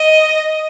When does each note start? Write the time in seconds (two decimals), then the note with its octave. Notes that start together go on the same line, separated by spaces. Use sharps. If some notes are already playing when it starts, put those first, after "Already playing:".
Already playing: D#5